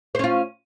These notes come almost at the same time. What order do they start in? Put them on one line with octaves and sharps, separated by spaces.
C5 C#4 F4